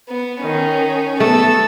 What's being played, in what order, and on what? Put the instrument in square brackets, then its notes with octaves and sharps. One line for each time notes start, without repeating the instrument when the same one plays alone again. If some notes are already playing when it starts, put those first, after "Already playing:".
[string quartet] B3
[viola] D#3 [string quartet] C#4
[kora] A3 [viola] B3 [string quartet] A4 E6